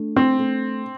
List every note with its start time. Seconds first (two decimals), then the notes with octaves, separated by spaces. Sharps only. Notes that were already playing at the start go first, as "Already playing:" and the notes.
Already playing: A3 D4
0.16 C4
0.39 A3